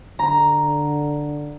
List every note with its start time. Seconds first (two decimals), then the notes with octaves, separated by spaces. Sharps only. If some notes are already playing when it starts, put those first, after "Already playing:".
0.19 D3 A#5